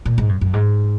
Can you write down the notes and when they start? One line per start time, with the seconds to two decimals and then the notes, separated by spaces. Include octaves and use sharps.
0.05 A#2
0.18 G#2
0.29 F#2
0.41 F#2
0.53 G#2